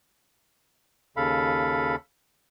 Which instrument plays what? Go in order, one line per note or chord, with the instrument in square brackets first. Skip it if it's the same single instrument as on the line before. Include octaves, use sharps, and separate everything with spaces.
[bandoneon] D#2 C#3 A4 F5 B5